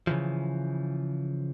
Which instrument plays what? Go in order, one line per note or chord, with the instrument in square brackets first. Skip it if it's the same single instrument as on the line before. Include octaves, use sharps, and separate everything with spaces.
[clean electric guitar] C#3 E3 F3